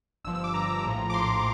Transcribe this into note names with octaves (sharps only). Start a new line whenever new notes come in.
G1 G2 F3 E6
E6
D6
G1 G2 F3 A#5
A#1 A2 F3
D6
A#1 A2 F3 C6